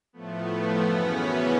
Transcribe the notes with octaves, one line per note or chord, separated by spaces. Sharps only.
A2 F3 A3 B3
F#2 C#3 E3 B3 C#4